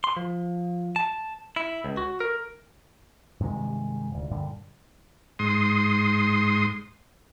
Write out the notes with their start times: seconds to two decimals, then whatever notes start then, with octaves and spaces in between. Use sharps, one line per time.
0.04 C6
0.17 F3
0.96 A5
1.56 E4
1.84 C#2
1.97 F#4
2.20 A#4
3.40 G2 C3 D#3 G#3
4.10 D#1 D2
4.31 G2 A#2 D3 G3
5.39 G#2 C6 D#6